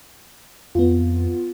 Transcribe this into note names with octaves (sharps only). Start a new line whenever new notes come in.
F2 B3 F4